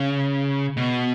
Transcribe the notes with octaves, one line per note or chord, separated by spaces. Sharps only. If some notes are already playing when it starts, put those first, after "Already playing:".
Already playing: C#3
B2